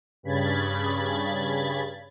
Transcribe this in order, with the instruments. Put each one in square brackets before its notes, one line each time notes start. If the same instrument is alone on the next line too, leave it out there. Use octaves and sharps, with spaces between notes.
[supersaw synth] G2 C#3 B5 G#6 A6